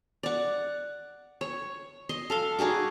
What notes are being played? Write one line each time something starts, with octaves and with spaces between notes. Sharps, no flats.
D5 F#5
C#5
D#5 C6
A4 F5 C6
D#4 F#4 G#4 D6